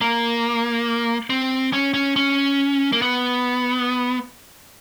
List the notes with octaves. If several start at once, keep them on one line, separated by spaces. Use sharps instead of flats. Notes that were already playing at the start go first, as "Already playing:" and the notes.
A#3
C4
C#4
C#4
C#4
A#3
B3